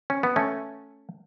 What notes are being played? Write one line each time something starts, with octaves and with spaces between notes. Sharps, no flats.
C#4
B3
A3 C#4